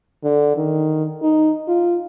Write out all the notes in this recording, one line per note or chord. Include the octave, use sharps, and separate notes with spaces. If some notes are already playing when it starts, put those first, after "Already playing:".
D3
D#3
D#4
F4